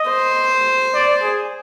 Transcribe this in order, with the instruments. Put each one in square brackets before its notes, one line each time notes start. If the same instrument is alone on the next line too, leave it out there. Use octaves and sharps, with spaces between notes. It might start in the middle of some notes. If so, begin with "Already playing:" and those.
Already playing: [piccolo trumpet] D#5
[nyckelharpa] C5
[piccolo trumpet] D5
G#4